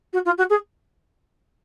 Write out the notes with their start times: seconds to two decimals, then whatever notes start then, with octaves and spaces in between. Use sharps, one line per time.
0.12 F#4
0.25 F4
0.37 F#4
0.49 G#4